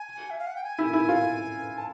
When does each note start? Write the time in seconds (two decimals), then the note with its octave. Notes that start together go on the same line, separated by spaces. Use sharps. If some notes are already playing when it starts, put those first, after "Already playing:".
Already playing: G#5
0.30 E5
0.38 F5
0.47 F#5
0.55 G5
0.64 G#5
0.79 E4
0.93 E4
1.09 F4
1.78 A5